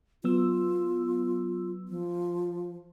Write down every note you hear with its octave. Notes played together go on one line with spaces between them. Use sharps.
F#3 B3 F4 E6
F3